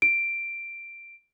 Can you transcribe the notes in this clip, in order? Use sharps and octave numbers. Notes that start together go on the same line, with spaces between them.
D7